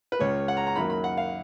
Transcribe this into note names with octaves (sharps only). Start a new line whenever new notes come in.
B4
C#2 C#3 G#3 C#5
F#5
A#5
A#5
F#2 D#3 F#3 A#3 B5
B5
F#5
F5